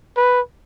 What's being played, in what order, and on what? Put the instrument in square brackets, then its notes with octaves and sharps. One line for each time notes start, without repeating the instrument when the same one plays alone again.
[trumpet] B4